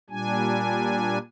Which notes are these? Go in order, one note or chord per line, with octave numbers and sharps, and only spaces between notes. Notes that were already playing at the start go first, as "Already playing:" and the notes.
A#2 G3 D4 G#5